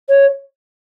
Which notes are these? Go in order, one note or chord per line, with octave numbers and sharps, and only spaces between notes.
C#5